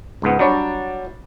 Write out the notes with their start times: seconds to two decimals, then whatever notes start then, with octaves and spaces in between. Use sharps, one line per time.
0.22 C#2 G#2 B3
0.39 F#3 G3 D4 C#5